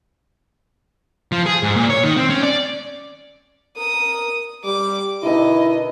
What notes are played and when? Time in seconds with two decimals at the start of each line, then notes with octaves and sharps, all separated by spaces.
1.32 F3
1.46 G#4
1.63 G#2
1.76 A#2
1.90 C#5
2.03 D#3
2.17 C4
2.30 C#4
2.43 D5
3.77 A#4 D#6
4.65 G3 D6
5.23 B2 D3 D#3 E4 D#5